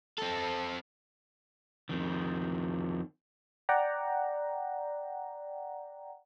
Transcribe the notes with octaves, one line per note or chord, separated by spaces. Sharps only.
C4 A4
F2 D#3
D5 F#5 G5 A#5